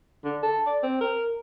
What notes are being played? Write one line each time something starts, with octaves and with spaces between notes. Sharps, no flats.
D3
A4
D5
C4
A#4